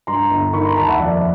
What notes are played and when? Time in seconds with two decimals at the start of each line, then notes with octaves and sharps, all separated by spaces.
0.07 G2 A#5 C6
0.31 G1
0.53 D#3 B5 C#6
0.65 A#5 C6
0.76 D#2 A5 B5
0.88 E5 F#5
0.99 F2 D5 E5